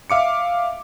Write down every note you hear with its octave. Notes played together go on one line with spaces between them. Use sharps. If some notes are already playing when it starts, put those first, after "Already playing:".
E5 F5 D6 C#7